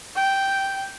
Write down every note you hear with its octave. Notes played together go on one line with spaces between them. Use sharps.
G5